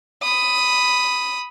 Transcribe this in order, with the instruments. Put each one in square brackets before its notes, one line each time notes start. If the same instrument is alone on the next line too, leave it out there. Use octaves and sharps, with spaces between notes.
[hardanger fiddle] B5 D#6